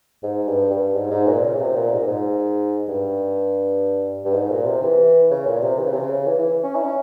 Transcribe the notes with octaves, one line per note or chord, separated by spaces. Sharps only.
G#2
G2
G2
G#2
G#2
A#2
C#3
A#2
C3
A#2
G#2
A#2
G#2
G2
G2
G#2
A#2
C3
E3
C#3
A#2
C3
E3
C#3
C3
C#3
E3
E3
C#4
E4
C#4